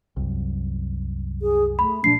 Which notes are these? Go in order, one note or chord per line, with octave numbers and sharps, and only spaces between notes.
C2 F#2
G#4
A3 B5
A#2 F3 A3 D4 C7